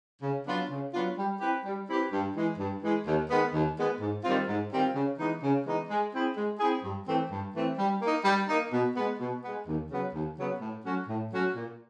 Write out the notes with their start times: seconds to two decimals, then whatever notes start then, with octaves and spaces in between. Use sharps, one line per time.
0.22 C#3
0.47 F#3 B3 D4 F4
0.70 C#3
0.94 F#3 B3 D4 F4
1.17 G3
1.40 C4 E4 G4 B4
1.64 G3
1.88 C4 E4 G4 B4
2.11 G2
2.35 E3 G#3
2.59 G2
2.82 E3 G#3
3.06 D#2
3.30 D#3 G#3 B3
3.53 D#2
3.76 D#3 G#3 B3
4.00 G#2
4.24 D#3 G3 C4 F4
4.47 G#2
4.71 D#3 G3 C4 F4
4.95 C#3
5.19 E3 G#3 B3 D#4
5.42 C#3
5.65 E3 G#3 B3 D#4
5.89 G#3
6.13 C4 E4 G#4
6.36 G#3
6.59 C4 E4 G#4
6.83 G2
7.07 E3 A3 C4
7.31 G2
7.54 E3 A3 C4
7.78 G3
8.02 A#3 D#4
8.25 G3
8.48 A#3 D#4
8.72 B2
8.95 G#3 B3
9.19 B2
9.43 G#3 B3
9.67 D#2
9.90 C#3 F#3 B3
10.14 D#2
10.37 C#3 F#3 B3
10.61 A2
10.85 F#3 A3 C#4 F#4
11.08 A2
11.32 F#3 A3 C#4 F#4
11.55 A#2